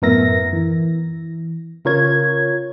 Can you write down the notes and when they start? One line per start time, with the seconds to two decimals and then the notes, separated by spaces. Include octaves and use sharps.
0.02 F#2 A2 B3 A#4 E5 A#6
0.53 E3
1.85 C#3 F4 A#4 C#5 G#6